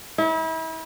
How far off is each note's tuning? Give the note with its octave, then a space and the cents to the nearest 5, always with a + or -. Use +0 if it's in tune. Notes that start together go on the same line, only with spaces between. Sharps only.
E4 -35